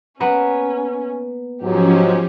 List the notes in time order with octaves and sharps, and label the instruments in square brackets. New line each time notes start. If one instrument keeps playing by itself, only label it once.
[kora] A#3 B3 [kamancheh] C#4
[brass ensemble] G#2 F#3 [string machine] F3 C#4 [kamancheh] G4